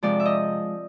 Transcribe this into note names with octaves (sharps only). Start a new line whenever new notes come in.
C3 F3 G#3 D5
E5
D#5